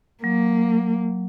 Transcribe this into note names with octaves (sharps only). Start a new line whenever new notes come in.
F#3 A#3